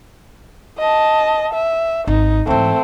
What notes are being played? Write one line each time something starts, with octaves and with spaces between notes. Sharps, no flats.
D#5 A5
E5
G#1 D#4
G#2 E3 A3 C4